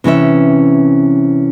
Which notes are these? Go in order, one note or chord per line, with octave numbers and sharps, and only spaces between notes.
C3 E3 C#4 E5